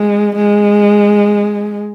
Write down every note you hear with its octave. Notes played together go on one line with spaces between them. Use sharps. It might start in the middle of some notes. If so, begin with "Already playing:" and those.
Already playing: G#3
G#3